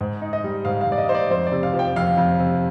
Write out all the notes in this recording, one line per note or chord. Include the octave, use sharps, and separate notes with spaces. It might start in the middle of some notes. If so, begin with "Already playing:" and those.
G#2
D#4
D#5
G3
G#2 F5
F5
G#2
D5
D#5
D#4 C5
D5
F2 C5
D5
C3
F5
F3
G5
F2 F5
F2
C3